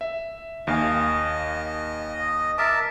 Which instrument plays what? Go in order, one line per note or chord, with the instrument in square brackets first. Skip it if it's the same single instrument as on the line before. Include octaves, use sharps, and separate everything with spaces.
[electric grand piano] E5
[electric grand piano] D#2 F5 G#5 [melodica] D#5
[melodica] A#4 E5 A5 [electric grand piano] D6